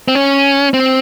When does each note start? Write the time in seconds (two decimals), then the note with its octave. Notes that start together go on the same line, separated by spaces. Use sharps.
0.08 C4
0.15 C#4
0.74 C4